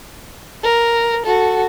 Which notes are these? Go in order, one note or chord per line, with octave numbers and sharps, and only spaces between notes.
A#4
F#4 A4